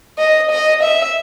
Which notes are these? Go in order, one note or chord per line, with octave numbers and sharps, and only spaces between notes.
D#5
D#5
E5